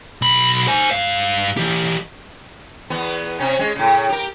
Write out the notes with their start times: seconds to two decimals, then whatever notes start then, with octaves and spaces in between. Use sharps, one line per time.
0.22 B1 B5
0.67 C5 G#5
0.91 G2 F5
1.57 E3 G4
2.90 E2 B3
3.40 C3 C#4
3.59 G#3 C#4
3.76 A2 C#3
4.09 G4 A#4